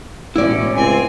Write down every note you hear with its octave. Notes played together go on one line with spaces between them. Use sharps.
E1 A2 C#4 E4 D5
C#2 C4 G#5